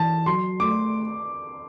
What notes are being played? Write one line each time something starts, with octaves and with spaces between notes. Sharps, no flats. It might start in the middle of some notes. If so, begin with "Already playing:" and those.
Already playing: E3 A5
F#3 C6
A3 D6